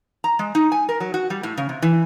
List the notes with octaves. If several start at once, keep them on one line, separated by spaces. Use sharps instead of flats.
A#5
G#3
D#4
G#5
A#4
F#3
F#4
G3
A2
C#3
C3
E3